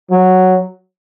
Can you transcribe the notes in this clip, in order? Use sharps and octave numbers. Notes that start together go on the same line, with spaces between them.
F#3